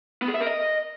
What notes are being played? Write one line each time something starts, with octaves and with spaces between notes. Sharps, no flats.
B3
G#4
E5
A#4
D#5